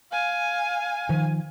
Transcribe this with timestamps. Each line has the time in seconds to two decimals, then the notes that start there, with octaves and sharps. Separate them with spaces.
0.12 F5 G#5
1.09 D#3 F3